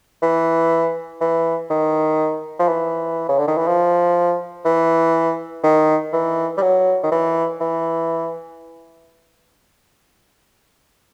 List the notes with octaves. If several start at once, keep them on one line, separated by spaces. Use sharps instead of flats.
E3
E3
D#3
F3
E3
C#3
D3
D#3
E3
F3
E3
D#3
E3
G3
F#3
D#3
E3
E3